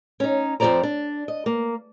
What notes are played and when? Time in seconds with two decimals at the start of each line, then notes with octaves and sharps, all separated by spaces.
0.20 C#4 D#4
0.60 F2 F3 F#4 C5 D5 A#5
0.83 D4
1.28 D#5
1.46 A#3